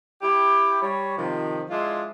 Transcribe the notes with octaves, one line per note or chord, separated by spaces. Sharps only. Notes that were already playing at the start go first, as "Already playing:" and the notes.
E4 G4
G3 C#5
C3 D#3 F3
F3 G#3 D4 E4 F4